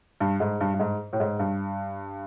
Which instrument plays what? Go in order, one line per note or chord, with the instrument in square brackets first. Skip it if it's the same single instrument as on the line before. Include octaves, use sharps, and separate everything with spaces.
[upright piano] G2
G#2
G2
G2
G#2
A2
G#2
G2